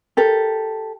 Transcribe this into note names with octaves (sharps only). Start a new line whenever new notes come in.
G4 A4 A#4